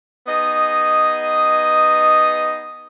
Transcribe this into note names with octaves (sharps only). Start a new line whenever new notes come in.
B3 D#4 G#4 D#5